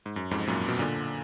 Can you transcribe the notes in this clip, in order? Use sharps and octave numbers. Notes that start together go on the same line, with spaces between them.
G#2
F#2
F2 G#2
F#2 A#2
B2
A#2 D3